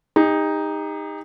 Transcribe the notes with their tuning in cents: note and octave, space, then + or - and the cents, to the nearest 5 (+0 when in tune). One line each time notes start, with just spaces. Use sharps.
D#4 +0 G4 +45